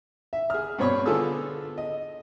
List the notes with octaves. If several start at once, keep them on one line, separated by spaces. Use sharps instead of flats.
E5
G#4 F6
G2 B2 C4 C#5 B5 C#6
D3 B3 F4 G#4 A4 E6
D#5